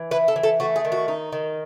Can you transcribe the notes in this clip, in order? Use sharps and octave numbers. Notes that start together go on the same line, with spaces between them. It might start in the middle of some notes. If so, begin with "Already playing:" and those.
Already playing: E3
E4 B4
A4
E3
A4
A3 F#4
G#4
D#3
F#4
D#4
D#3